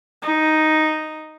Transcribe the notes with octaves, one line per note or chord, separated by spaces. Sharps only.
D#4